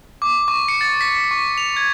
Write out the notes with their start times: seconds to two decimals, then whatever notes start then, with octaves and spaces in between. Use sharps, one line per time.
0.22 D6
0.48 C#6
0.68 C#7
0.81 A6
1.01 B6
1.31 C#6
1.58 F7
1.77 G#6